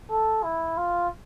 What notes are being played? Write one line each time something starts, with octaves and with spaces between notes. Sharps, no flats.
A4
E4
F4